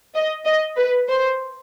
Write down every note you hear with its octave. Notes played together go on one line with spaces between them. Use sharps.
D#5
D#5
B4
C5